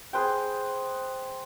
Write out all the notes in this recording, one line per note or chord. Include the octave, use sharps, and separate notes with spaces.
G#4 B4 C5 G5